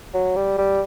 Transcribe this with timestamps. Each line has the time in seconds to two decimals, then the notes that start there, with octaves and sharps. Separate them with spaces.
0.14 F#3
0.36 G3
0.58 G3